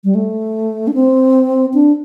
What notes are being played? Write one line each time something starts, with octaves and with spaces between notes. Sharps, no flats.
G3
A3
D4
C4
D4